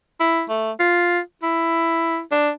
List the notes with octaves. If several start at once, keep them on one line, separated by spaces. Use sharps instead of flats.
E4
A3
F4
E4
D4